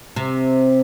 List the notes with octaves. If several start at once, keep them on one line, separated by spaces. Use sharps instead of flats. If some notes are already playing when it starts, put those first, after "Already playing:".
C3